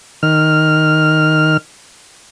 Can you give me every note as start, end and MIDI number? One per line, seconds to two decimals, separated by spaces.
0.23 1.57 51
0.23 1.57 89